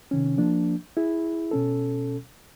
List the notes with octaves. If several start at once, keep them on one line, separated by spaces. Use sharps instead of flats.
C3 D#3 C#4
F3 A#3 D4
E4 G#4
B2 C#4 A4